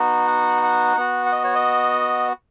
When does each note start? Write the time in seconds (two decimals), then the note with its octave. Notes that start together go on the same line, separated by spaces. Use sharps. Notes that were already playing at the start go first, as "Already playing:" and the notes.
Already playing: B3 D#4 F#4
0.27 F#5
0.63 F#5
0.97 B3 F#4
1.26 F#5
1.32 D#5
1.44 C#5
1.55 D#5